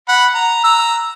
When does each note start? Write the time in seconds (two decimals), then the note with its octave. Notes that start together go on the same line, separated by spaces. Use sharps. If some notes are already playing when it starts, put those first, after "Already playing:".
0.09 F#5 B5
0.35 A#5
0.64 A#5 E6